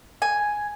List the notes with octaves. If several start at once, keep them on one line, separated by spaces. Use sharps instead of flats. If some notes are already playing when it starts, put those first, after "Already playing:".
G#5